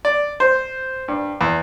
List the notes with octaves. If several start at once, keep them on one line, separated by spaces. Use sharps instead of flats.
D5
C5
G2
E2